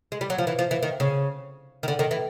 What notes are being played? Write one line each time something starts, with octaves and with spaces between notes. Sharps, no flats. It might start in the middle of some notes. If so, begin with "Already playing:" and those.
G#3
G3
F#3
F3
E3
F3
E3
D#3
C#3
D#3
D3
D#3
E3